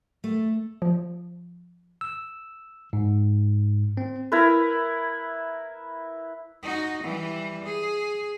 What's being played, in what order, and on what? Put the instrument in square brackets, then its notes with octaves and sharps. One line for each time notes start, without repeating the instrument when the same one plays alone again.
[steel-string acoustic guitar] A3
[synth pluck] F3
[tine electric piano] E6
G#2
C4
[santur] E4 A#4 B4
[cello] D#4 F#4
E3 G3
G#4